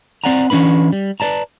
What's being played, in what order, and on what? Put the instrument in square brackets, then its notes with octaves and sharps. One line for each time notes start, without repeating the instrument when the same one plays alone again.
[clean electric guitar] C4 D5 F#5 G#5 A#5
E3 C#4 D4 B4 B5
G3
B4 C5 D5 A5 A#5